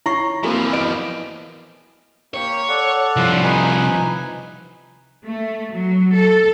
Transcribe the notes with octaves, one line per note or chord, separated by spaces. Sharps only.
E4 C#5 C#6 A#6 C7
E3 F3 A#3 C4 F#4 A#4
B3 D#5 D7
A#3 G4 C#5
A4 D5 F#5
C2 F3
D#4 B4 G#5
A3
F#3
A4